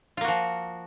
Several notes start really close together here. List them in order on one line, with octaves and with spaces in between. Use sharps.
F4 A#3 F#4 F3